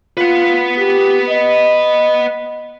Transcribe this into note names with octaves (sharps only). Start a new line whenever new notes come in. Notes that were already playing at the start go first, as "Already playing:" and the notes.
F4 B4 F#5
G4
D#5